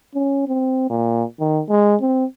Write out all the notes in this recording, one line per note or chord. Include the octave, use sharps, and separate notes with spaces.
C#4
C4
A#2
D#3
G#3
C4